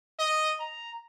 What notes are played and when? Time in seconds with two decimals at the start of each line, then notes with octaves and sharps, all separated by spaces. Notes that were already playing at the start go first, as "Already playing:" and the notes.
0.19 D#5
0.60 A#5